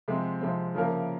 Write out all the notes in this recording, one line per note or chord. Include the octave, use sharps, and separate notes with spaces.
C3 F3 G#3 C4
C3 F3 G#3 C4
C#3 F3 A#3 E4 A#4